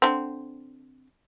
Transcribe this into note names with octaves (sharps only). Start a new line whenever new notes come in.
D3 E3 C4